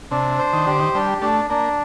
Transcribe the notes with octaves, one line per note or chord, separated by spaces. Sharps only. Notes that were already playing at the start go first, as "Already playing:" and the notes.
C3 D4
C5
D#3
D3 G4
D#3
G3 D4
A3 D4
A#3 D4